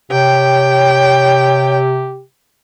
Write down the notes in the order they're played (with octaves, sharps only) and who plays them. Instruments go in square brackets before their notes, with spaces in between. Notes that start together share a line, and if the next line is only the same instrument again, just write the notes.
[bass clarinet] C3 [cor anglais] G4 [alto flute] C#5 [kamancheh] G5